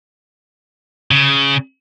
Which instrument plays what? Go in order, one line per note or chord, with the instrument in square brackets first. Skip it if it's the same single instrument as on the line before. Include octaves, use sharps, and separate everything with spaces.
[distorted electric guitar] C#3